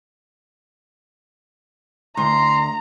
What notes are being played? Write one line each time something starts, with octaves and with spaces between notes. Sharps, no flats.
D2 A#5 C6